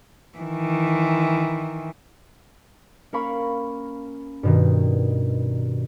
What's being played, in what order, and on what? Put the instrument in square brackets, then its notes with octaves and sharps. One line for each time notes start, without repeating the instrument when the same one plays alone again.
[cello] D#3 E3
[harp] A#3 C#4 A#4 F5 B5 C#6
G2 B2 D#3